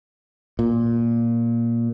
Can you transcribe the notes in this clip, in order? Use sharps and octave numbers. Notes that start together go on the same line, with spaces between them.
A#2